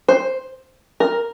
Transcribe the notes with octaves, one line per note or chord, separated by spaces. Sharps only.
C5
A#4